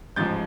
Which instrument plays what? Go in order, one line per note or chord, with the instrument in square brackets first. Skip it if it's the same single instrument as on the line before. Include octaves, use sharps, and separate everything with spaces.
[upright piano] A1 G#2 F3 G6 A6